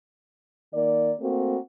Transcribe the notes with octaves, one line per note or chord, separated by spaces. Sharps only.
D#3 A#3 D5
A3 A#3 C4 F#4